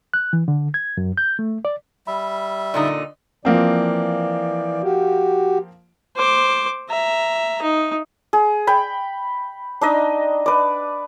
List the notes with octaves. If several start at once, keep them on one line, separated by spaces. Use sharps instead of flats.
F#6
E3
D3
G#6
F#2
G6
A3
D5
G3 E5 B5
A#2 D3 D#4 D5 D#5 D#6
E3 F3 A#3 C4 D5
F#4 G4
C5 D6
E5 A#5
D#4
G#4
G5 B5
D4 D#4 D#5
B4 D5